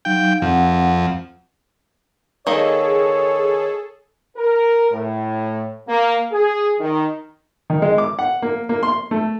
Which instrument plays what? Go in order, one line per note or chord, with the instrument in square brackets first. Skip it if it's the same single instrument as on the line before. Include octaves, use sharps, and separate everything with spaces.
[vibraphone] F#3 D#4 F5 [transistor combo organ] G5
[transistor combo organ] F2 [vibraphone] C4 F#5
[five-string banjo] D#3 A#3 D#5 [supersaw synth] G#4 A4 [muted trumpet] C#5
[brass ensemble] A#4
A2
A#3
G#4
D#3
[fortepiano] D#3
G#3
D6
F#5
A#3
A#3
C6
A3